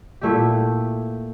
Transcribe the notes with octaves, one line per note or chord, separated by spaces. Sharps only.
A#2 A3 E4 G4